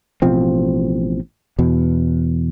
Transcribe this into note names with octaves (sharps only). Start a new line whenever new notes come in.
A1 B2 F3 C4
E2 B2